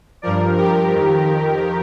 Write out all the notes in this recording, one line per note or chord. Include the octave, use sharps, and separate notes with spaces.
G2 F3 A#4 D5
G4 A#4
F2 D#3